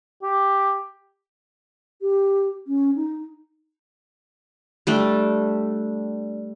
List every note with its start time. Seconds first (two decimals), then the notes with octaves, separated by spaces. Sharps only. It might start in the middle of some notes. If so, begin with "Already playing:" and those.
0.23 G4
2.02 G4
2.67 C#4
2.96 D#4
4.87 G3 A3 D4